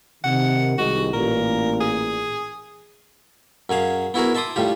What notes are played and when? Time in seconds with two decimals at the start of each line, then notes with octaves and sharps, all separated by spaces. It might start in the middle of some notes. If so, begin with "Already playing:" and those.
0.24 C3 D#3 F#5
0.78 C2 D#3 G#3 F#4
1.13 A1 A#2 A#4
1.81 G#4
3.69 F#2 F#3 G#4 F5
4.14 B3 E4 F#4 G#4 A#4
4.35 E5 A5 C6 D6 D#6
4.56 A2 G3 F4 G4